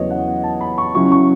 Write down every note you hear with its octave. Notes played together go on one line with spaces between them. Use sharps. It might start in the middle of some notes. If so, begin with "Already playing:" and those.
Already playing: E2 C#3 F#3 B3 B4 C#5 D#5
F#5
A5
B5
C#6
C#3 F#3 C#4 E4 C#6
C#6